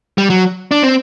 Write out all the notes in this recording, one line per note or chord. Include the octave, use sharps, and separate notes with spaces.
G3
F#3
D4
C4